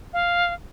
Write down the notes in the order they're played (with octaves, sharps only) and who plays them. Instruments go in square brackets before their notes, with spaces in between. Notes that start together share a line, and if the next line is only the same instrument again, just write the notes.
[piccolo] F5